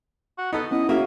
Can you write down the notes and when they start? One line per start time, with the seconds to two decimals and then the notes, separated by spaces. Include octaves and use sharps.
0.38 F#4
0.53 B3 D#4 A4
0.71 B3 C#4 E4 D#5
0.89 A#3 C#4 F#4 G#4 E5 F5